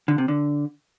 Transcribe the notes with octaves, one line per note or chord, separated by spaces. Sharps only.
D3
C3
D3